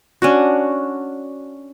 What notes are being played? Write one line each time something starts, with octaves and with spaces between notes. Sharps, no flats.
C#4 D4 F#4